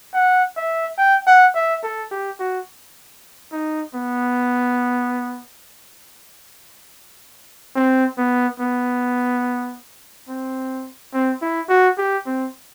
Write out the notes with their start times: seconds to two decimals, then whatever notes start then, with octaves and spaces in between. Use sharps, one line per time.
0.14 F#5
0.57 E5
0.98 G5
1.27 F#5
1.55 E5
1.83 A4
2.11 G4
2.40 F#4
3.52 D#4
3.95 B3
7.75 C4
8.18 B3
8.60 B3
10.29 C4
11.14 C4
11.42 E4
11.69 F#4
11.98 G4
12.26 C4